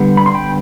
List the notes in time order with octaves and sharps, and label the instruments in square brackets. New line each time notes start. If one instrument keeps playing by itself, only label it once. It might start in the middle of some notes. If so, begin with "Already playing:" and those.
Already playing: [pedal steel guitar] D3 G3 B3
B5
C6
G5 B5